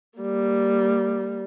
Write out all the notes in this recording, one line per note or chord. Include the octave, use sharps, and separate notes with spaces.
G3 A#3